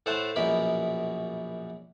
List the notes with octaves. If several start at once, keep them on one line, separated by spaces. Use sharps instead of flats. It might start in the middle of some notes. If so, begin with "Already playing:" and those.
A2 A3 C5 F#5 A5
A#1 F#2 B2 A#4 B5